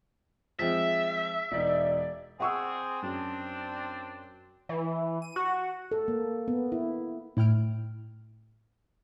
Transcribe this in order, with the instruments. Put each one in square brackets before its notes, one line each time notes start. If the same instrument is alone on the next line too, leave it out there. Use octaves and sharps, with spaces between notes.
[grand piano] F3 G#3 C4 [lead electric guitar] E5
[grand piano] E1 D#4 [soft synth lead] D5
[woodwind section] C4 G#4 [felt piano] F#5 C#6 E6
[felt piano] F#2 [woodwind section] C4 D4
[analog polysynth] E3
D#7
F#4
[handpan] A4
A#3
B3
E4
[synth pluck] A2 E4 G5 F6 D7